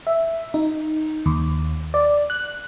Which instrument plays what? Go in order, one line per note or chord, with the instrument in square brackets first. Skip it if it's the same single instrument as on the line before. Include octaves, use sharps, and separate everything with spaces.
[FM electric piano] E5
D#4
D#2
D5
F#6